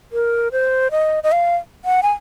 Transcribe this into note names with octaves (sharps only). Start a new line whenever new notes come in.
A#4
C5
D#5
D#5
F5
F#5
G#5